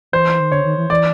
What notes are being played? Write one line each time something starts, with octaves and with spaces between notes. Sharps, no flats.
E3 C5
D#3
D3 C#5
D#3
E3
E3 D5